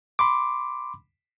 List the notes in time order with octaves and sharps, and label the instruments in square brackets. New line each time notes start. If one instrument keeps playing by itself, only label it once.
[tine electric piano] B5 C6 D6